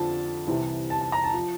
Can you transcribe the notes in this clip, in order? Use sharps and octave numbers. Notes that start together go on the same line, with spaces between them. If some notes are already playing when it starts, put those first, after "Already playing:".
Already playing: F2 D3 F3 A5
C2 C3 E3
A5
A5
A#5
A5
F3